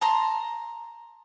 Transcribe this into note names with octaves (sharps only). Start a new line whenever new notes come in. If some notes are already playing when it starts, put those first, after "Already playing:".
A5 A#5 C6